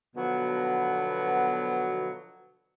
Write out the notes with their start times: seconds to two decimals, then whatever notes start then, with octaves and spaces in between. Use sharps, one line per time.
0.16 B2 D3 F3 F#3 B3